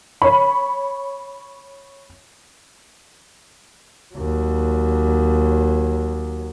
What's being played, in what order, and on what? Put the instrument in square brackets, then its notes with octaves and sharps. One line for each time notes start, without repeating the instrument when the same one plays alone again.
[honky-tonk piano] C#5 B5
[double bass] D#2 F#3